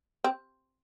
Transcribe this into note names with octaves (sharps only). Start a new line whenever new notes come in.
C4